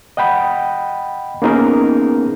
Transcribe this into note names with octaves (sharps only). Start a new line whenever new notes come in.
D#5 F#5 G5 B5
A#3 B3 C#4 D#4 G#4 A#4